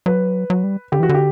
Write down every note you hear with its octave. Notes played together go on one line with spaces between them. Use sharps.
F#3 B4
F#3
G3
D3 G4
E3 F#4
D3
G4